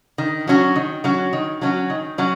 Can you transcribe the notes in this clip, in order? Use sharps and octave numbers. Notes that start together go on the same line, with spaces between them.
D#3
F#3 C#4 F#4
D#3
F#3 C#4 F#4
D#3
F#3 C#4 F#4
D#3
F#3 C#4 F#4